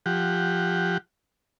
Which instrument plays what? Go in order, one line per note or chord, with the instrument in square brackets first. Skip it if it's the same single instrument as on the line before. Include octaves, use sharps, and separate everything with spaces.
[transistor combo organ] F3 G4 F#5